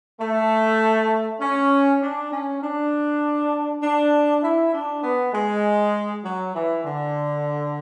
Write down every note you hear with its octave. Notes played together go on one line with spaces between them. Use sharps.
A3
C#4
D4
C#4
D4
D4
E4
D4
B3
G#3
F#3
E3
D3